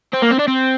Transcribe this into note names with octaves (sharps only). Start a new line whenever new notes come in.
C4
A#3
C4
D4
C4